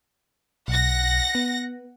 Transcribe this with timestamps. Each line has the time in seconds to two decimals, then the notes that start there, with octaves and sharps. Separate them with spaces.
0.68 B1 F#5 A#6
1.35 B3